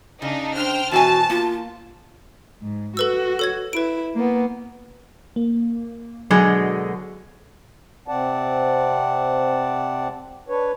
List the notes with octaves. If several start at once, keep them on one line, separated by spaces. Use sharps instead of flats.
C#3 D4 D#4
D4 C5 G5 F6
E2 B2 F#4 G#5 A5
A#3 F4
G#2
F#4 A4 B4 E6
A4 C#5 G#6
E4 B4 D7
A#3 B3
A#3
B2 D3 F#3 G#3
C3 C4 D5 F#5 A5
D4 B4 C#5